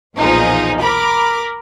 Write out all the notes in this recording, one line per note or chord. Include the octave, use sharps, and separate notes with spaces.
B1 E2 A#2 F3 D#4 G#4
A#4 B5 D6